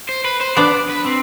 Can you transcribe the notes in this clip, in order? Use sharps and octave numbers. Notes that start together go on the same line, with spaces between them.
C5
B4
C5
B3 D4 D5
B4
C4